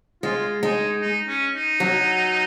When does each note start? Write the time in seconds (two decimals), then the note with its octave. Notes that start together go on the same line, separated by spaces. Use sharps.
0.23 G#3 F4
0.62 G#3 D#4
1.02 D#4
1.28 C#4
1.54 D#4
1.80 F#3